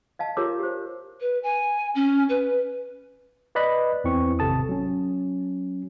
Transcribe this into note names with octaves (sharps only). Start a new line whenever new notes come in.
D#5 F5 A5
F4 G4 A#4 C#5 A#5 D6
G4 C5
B4
G#5
C#4
B4
B4 D5 D#5 B5 F#6
E2 E3 C4 C#6
G#1 C3 A4 A5 D#6
F#3 C#4